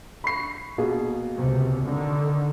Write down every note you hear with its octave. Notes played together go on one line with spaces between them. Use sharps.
B5 C#6 C7
B2 A#3 G#4
C#2 C3
D3 D#3